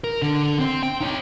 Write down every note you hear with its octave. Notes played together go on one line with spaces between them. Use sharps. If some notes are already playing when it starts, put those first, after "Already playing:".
A#4
D3 D4
C4
G5
D#4 C#5